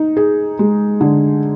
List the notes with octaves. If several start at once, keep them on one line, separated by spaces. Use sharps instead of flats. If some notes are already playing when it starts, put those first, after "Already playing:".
Already playing: D#4
G#4
G#3
D3